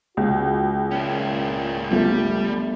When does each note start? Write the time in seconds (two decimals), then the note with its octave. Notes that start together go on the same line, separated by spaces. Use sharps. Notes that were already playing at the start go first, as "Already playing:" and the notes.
0.17 C#2 F#4
0.91 A#2 C#4 E4
1.90 G1 F3 G3 A3